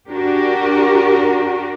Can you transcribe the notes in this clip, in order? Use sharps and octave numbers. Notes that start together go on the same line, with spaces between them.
D4 F#4 G4 A#4